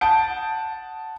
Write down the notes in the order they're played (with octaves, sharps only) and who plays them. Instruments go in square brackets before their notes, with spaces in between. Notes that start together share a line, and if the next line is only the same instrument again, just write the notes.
[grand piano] F#5 A5 D#6 G6 D7